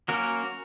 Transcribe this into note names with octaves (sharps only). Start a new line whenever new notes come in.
F#3 A#3 C#4 F#4 A#4